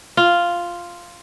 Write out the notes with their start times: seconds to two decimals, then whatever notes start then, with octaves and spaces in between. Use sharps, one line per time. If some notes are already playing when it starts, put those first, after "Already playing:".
0.17 F4